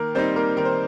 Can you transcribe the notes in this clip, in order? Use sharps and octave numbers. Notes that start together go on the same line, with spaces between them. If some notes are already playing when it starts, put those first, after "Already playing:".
Already playing: D#3 A#3 A#4
G3 C4 D#4 C5
A#3 A#4
D#3 A#4
C5